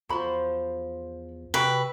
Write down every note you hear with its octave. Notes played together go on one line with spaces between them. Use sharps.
E2 F3 F#4 C5 B5
C3 F#4 B4 E5 G5